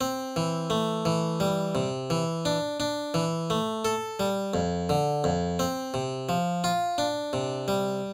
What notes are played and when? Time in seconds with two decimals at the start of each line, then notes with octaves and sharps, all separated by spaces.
0.01 C4
0.36 E3
0.70 A3
1.05 E3
1.40 G3
1.75 C3
2.10 E3
2.45 D4
2.80 D4
3.14 E3
3.50 A3
3.85 A4
4.20 G3
4.54 F2
4.89 D3
5.24 F2
5.59 C4
5.94 C3
6.29 F3
6.64 F4
6.98 D4
7.33 C3
7.68 G3